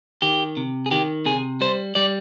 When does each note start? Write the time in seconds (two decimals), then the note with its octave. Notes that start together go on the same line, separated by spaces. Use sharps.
0.22 D#3 G4
0.57 C3
0.86 G#4
0.91 D#3 G4
1.26 C3 G#4
1.61 G3 C5
1.95 G3 D5